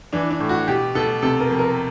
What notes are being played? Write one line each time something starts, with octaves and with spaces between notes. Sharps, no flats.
E3 D4
D4
A2
F#4
B2 G4
B2 A4
C3 A4
A#4
F2
A#4